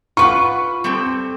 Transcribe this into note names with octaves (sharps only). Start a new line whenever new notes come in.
F4 B4 F#5 C#6
G3 C4 A4